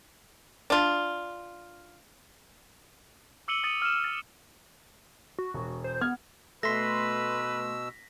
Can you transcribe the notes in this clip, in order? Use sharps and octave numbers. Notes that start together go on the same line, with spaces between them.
D4 F4
D6 E6 C#7 D#7 F#7 G7
D#6 A6 C#7 D#7 G7
F6 E7
A6
F#4
E1
C5
B3 F6 G#6
B2 A3 B4 C6 E6 A#6 B6